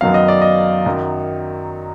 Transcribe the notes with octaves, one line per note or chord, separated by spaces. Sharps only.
F#2 D#3 F#3 B3 F5
D#5
D5
D#5
F#2 D#3 F#3